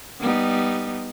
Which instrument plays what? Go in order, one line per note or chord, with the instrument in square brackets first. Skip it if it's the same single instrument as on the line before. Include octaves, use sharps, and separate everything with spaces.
[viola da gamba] G3 B3 D#4